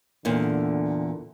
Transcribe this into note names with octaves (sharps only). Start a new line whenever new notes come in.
E2 A#2 D3